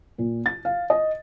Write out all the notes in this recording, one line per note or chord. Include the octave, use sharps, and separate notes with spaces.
A#2
A6
F5
D#5